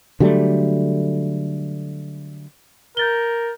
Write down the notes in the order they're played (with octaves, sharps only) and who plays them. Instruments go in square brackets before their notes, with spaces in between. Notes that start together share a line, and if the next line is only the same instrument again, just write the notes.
[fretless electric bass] D3 F#3 G3 A3
[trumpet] A#4 [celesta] G6 A6 G7